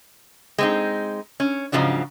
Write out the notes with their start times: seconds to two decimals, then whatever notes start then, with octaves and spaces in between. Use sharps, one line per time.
0.58 G#3 C4 D#4
1.40 C#4
1.72 G#2 C#3 F3 F#3 D4